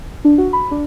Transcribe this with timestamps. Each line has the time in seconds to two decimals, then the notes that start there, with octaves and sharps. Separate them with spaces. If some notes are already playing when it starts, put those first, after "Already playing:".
0.25 D4
0.38 F#4
0.53 B5
0.71 D4